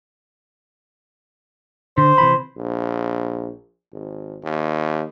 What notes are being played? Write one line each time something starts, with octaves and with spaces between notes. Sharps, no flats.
D3 C5
C3 E3 B5
A#1
G#1
D#2